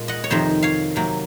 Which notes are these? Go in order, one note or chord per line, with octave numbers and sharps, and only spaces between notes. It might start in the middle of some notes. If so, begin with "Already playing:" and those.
Already playing: A#2 G#3
D#5 F#5
C#5
F2 C3 D#3 C5 D#5
C#5 F5
C3 F#3 A#3